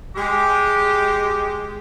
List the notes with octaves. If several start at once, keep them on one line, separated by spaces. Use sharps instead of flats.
G#3 G4